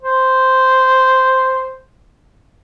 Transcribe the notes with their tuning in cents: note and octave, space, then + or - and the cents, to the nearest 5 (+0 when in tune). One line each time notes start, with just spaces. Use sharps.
C5 -5